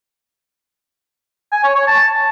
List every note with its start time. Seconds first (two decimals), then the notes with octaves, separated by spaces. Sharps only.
1.52 G#5
1.64 C#5
1.76 C#5
1.87 A5